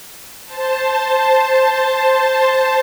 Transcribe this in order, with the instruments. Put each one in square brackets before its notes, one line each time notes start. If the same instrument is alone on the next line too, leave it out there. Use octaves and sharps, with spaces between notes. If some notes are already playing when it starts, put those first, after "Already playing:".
[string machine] C5 A5